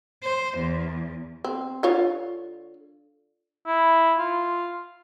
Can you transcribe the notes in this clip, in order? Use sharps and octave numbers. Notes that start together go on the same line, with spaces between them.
C5
E2
C4
D3 F4 C#5
E4
F4